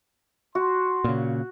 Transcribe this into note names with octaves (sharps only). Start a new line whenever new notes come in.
F#4 C6
A#2 C#3